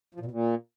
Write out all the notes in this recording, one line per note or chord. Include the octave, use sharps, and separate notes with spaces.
F3
A#2
B2
A#2